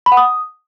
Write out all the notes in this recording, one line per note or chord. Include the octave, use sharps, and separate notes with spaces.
B5
F#5
D#6